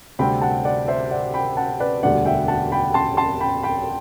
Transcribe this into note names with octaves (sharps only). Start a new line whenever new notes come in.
D2 C3 G3 C4 G5 B5
F#5 A5
D5 F#5
C5 E5
D5 F#5
G5 B5
F#5 A5
B4 D5
E1 D2 D3 G3 D5 F#5
E5 G5
F#5 A5
G5 B5
A5 C6
A5 C6
G5 B5
G5 B5